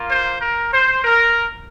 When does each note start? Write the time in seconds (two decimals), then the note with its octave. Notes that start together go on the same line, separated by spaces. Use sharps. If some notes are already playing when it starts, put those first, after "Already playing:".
Already playing: A#3 F4
0.11 C5
0.41 A#4
0.73 C5
1.04 A#4